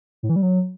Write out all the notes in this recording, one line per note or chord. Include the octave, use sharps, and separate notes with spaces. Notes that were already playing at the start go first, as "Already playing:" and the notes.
A2
E3
G3
F#3